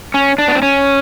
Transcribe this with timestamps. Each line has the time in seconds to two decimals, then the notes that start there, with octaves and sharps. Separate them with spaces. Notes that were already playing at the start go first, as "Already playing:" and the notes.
0.14 C#4
0.38 D4
0.48 B3
0.55 C4
0.62 C#4